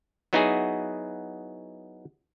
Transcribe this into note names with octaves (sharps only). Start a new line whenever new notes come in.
F#3 B3 D#4 E4 F#4 G#4